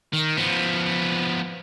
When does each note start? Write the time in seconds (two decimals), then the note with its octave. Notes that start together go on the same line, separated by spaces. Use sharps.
0.13 D#3
0.37 F3 B3